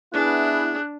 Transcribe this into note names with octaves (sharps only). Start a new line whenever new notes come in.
B3 D4 E4 G#4 F#6